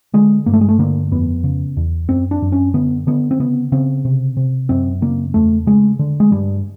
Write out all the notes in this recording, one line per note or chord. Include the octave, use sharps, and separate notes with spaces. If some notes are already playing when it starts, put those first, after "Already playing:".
D3 G#3
G2 A#3
A3
G#3
A3
D3 A#3
F2 B3
C#3
E2
F#2 C4
D4
F#2
C#4
D3 B3
D3 B3
C4
C#3 B3
C#3 C4
C3
C3
F#2 C4
C#3 A#3
E2 A3
C#3 G#3
D3
G#3
G2 G3